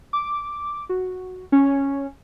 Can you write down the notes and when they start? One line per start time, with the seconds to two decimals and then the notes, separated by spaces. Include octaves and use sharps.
0.13 D6
0.89 F#4
1.52 C#4